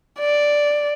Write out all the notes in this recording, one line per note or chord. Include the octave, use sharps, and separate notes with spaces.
D5